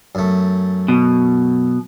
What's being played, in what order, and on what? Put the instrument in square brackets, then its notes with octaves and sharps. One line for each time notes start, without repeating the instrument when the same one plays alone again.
[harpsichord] F#2 A3
[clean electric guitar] B2